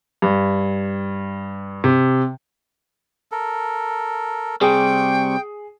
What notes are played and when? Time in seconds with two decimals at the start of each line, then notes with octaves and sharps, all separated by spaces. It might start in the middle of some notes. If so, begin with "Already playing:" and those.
0.22 G2
1.84 C3
3.32 A4 A#4
4.61 C3 G3 G#4 G5 C#6